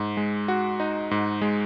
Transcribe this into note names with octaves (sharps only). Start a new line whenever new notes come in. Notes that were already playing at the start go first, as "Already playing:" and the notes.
Already playing: G#2
G#3
F#4
D#4
G#2
G#3